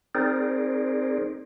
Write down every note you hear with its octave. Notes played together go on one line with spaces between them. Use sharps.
C4 D#4 G#4 A#4 C5 D5